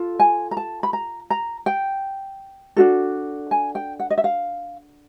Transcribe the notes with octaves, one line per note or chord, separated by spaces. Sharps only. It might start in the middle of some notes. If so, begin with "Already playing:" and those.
Already playing: F4 A4
G#5
A#5
A5
B5
A#5
A#5
G5
D4 F#4 A4
G#5
G5
F#5
D#5
E5
F5